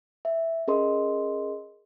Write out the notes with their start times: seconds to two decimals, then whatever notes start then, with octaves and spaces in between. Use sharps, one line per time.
0.25 E5
0.68 C#4 G#4 A#4 D#5 C6